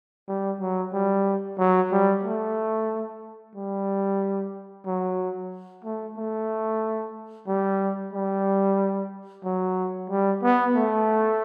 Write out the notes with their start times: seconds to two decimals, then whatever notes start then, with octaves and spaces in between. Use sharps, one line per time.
0.28 G3
0.60 F#3
0.93 G3
1.58 F#3
1.92 G3
2.23 A3
3.55 G3
4.86 F#3
5.84 A3
6.17 A3
7.47 G3
8.13 G3
9.45 F#3
10.10 G3
10.43 B3
10.75 A3